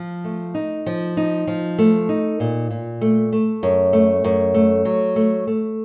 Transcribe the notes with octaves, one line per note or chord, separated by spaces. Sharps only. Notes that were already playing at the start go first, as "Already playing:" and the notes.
Already playing: F3
A3
D#4
F3
D#4
F3
A3
D#4
A#2
A#2
A3
A3
F#2
A3
F#2
A3
F#3
A3
A3